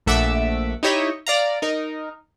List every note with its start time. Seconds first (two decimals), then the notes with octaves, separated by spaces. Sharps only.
0.06 A#1 A3 E5 F#5 D6 E6
0.83 D#4 E4 G4 C#5 D#5 E5
1.27 D5 F5 A#5
1.62 D#4 A#4